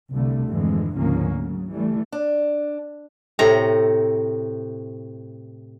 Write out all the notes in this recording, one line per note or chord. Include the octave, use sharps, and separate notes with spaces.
C2 D3 G3 A3
G#1 F2 G#2 D3 E3 G#3
D2 G#2 C#3 F3 A#3 C#4
C#3 F#3
E3 G3 A3
D4
A2 C3 A#5